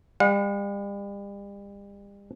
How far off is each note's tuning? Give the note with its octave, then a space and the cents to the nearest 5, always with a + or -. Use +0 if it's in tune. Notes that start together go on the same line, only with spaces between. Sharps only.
G3 +40 F#5 -45